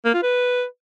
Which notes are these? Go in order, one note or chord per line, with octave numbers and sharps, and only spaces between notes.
A#3
F4
B4